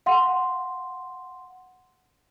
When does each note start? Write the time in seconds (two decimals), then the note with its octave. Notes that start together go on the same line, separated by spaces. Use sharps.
0.06 F5 F#5 C6